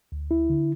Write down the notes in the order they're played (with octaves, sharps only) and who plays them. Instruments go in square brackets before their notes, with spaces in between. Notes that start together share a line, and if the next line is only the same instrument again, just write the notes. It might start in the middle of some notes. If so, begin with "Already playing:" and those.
[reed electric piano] D2
E4
D3